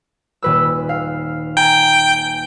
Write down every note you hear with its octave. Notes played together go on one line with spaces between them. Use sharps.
D#1 B4 E6
F5
G5 G#5 A#5